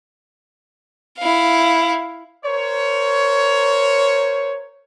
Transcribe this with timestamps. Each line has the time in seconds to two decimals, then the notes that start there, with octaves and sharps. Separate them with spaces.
1.19 E4 F5
2.44 A#4 C5 C#5